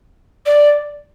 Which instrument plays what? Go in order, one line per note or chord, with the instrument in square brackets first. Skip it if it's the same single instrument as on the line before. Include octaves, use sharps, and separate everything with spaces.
[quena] D5